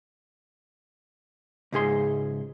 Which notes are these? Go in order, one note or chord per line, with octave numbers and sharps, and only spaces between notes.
C#2 G#2 G#4 C6